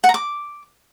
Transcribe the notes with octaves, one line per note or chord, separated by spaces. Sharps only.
F#5
A#5
D6